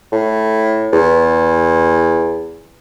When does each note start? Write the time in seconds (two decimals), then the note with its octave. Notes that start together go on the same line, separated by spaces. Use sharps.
0.12 A2
0.93 E2